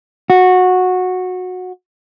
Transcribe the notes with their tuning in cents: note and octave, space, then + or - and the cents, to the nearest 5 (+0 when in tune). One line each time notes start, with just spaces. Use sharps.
F#4 -15